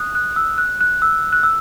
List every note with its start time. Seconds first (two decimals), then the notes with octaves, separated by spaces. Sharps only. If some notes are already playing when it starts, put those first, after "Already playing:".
Already playing: D#6 F#6
0.15 F#6
0.36 E6
0.58 F#6
0.81 F#6
1.02 E6
1.32 F#6
1.43 E6